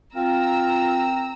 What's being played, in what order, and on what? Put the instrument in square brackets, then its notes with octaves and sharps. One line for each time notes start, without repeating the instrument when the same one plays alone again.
[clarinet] C4 [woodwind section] F4 A#4 [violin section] A#5 E6